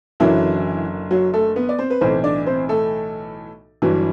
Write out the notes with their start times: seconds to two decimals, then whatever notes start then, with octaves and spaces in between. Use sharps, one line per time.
0.20 F#1 F#2 D3 E3 F#3 E4
1.11 F#3 F#4
1.33 A3 A4
1.56 B3 B4
1.69 D5
1.79 C4 C5
1.90 B4
2.01 B1 A2 E3 C4 C5
2.24 D4 D5
2.46 C4 C5
2.69 A3 A4
3.82 G1 G2 E3 F#3 F#4